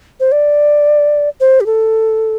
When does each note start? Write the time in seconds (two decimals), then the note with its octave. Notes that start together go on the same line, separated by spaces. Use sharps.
0.20 C5
0.32 D5
1.40 C5
1.60 G4
1.66 A4